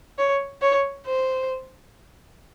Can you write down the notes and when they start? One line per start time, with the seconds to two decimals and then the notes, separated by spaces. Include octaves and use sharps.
0.18 C#5
0.62 C#5
1.06 C5